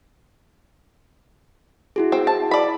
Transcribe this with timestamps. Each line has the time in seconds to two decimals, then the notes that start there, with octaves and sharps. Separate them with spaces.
1.96 E4 F#4 G#4
2.12 C4
2.27 A5
2.51 D5 B5